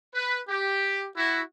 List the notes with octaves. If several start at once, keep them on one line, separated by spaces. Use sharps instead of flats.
B4
G4
E4 F#4